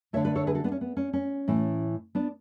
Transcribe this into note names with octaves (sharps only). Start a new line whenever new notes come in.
D3 A3 C#5 E5
B4 D5
A4 C#5
G#4 B4
F#4 A4
B3 D4
C#4
B3
C#4
C#4
A2 E3 A3
B3 D4